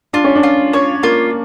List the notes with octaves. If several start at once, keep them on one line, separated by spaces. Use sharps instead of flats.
D4 F4
C#4
D4
F4
C#5
A#3 F4